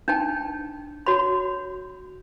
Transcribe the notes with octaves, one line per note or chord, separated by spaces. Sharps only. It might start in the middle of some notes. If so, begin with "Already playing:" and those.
D4 D#4 G5 A5
F#4 C#5 B5